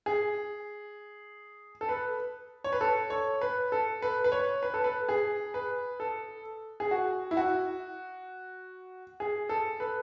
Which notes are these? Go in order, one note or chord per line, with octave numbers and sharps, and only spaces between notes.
G#4
A4
B4
C#5
B4
A4
C#5
B4
A4
B4
B4
C#5
B4
A4
B4
G#4
B4
A4
G#4
F#4
E4
F#4
G#4
A4
B4